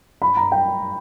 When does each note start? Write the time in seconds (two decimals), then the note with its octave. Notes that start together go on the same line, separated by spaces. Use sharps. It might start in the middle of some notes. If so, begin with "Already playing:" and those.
0.22 B5
0.37 A#5
0.52 G5